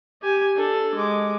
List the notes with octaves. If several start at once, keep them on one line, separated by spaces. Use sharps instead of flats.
G4 G#5
D4 A4
G#3 D6